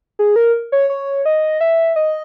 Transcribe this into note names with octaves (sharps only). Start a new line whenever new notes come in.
G#4
A#4
C#5
C#5
D#5
E5
D#5